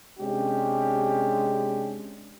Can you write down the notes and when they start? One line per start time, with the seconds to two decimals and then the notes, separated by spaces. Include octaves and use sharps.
0.19 C3 G#3 C#4 D4 G4